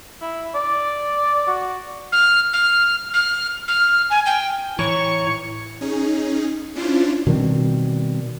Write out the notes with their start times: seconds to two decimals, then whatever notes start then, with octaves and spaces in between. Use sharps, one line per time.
0.21 E4
0.55 D5
1.47 F#4
2.12 F6
2.53 F6
3.13 F6
3.67 F6
4.10 G#5
4.26 G5
4.79 A2 E3 C#5 A#5 C#6
5.81 C#4 D#4 G#4
6.76 C#4 D4 E4 F4 C5
7.27 B2 D#3 G3 C4